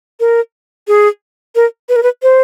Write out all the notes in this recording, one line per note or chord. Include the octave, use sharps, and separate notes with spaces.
A#4
G#4
A#4
B4
A#4
B4
C5